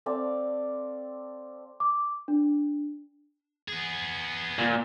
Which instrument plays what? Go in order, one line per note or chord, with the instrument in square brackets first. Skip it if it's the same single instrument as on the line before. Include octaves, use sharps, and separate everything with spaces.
[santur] C4 A4 D5 F5
[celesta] D6
D4
[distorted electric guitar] B3 G#4
[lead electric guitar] A#2